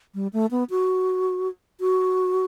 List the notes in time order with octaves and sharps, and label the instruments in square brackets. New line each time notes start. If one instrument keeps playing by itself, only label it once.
[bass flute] G3
A3
B3
F#4
F#4